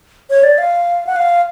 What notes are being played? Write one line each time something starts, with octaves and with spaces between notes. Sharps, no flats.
C#5
D5
F5
F#5
F5